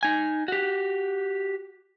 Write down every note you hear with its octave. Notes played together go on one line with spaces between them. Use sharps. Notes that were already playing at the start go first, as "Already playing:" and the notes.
D#4 G#5
F#4 G4